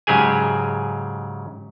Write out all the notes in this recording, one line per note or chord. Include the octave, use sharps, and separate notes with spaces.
G#2 C#3 F#3 G4 G#4 G#5